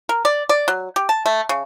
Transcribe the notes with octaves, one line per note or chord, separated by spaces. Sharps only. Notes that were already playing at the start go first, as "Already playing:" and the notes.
A#4
D5
D5
F#3
G4
A5
A3
C#3